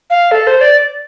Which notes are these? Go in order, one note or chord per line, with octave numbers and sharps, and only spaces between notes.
F5
A4
C5
D5